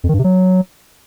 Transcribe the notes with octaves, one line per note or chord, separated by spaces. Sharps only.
F2
D#3
G2
C3
F#3